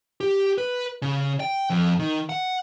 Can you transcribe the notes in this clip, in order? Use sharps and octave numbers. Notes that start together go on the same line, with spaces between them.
G4
B4
C#3
G5
F2
D#3
F#5